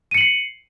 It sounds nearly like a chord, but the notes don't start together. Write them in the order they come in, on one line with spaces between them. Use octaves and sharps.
D#7 C#7 F#7 C7